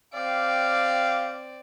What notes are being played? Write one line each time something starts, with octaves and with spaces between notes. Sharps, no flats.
C4 G4 D5 F5